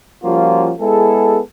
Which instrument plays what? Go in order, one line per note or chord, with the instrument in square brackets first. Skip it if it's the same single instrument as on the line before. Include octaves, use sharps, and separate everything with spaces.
[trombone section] F3 G3 A#3 C#4 F4 F#4
G#3 B3 E4 G#4 A4